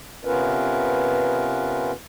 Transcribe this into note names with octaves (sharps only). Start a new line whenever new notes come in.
C3 B3 C#4 F4 A#4 B4